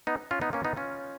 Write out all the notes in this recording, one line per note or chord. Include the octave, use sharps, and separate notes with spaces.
B3 D#4
C#4 F4
B3 D#4
A#3 C#4
B3 D#4
C#4 F4